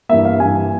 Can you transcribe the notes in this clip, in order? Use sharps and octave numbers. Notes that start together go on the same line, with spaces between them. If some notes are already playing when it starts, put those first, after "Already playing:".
G2 E3 G3 A#3 E5
F5
G2 E3 G3 A#3 G#5